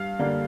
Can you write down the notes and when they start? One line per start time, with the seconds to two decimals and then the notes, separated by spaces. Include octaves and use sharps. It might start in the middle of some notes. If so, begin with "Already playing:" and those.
Already playing: G2 F5
0.19 D3 G3 A#3 D4